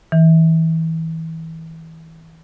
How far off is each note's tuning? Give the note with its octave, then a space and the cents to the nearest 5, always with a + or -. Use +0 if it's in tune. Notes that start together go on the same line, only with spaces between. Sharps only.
E3 -30